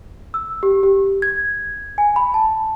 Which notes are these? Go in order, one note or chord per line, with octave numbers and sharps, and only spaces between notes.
E6
G4
G4
G#6
G#5
B5
A5